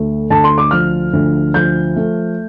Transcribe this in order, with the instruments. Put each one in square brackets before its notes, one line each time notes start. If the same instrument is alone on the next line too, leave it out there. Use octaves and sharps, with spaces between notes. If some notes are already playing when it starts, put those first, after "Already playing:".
Already playing: [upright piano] D2 A3
D2 A5
C6
D6
F3 F6
D2
F3 G6
A3